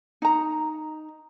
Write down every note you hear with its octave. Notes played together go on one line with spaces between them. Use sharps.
D#4 A#5